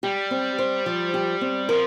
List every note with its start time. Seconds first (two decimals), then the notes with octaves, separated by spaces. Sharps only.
0.03 G3 G4
0.31 C4
0.59 C5
0.86 F3
1.14 G4
1.41 C4
1.69 F3 A#4